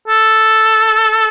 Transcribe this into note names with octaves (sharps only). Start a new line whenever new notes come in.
A4